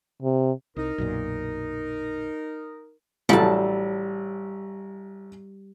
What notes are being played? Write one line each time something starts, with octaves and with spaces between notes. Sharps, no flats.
C3
C2 D#4 A#4
B1 F#2 A#2
A1 F#3 G3 A4 A5